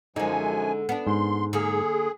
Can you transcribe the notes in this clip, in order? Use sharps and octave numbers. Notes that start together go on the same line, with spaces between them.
F#2 D3 F3 G#3 D#4 G#5
B3 D4
G#2 C6
D3 A#3 G#4